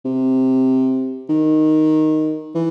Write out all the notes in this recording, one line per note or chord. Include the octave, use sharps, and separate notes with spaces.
C3
D#3
E3